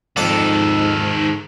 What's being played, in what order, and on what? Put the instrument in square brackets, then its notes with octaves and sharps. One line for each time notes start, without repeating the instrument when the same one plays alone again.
[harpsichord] F2 D5 A5 [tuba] G#2 [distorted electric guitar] D#3 A4